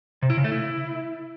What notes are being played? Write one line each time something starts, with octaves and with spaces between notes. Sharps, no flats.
C3
E4
C#3
A3
E4